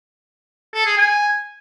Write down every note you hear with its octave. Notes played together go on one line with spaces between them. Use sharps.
A4
G#4
G#5